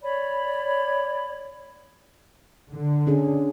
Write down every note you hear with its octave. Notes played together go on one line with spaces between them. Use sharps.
C#5 D5 B5
D3
C#4 D4 G#4